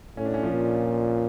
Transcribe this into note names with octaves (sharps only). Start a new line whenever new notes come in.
A2 C#4
D4
C#4
F3
A#2